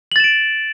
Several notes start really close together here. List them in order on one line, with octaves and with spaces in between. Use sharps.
F#7 A6 E7 D7